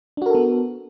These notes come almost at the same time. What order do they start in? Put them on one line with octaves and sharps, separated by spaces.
D4 F#4 A#4 A4 B3